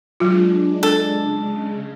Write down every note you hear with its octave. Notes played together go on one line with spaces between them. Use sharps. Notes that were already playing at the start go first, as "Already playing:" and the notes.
F#3 G#3 D4 F4
A4
C#3 G#3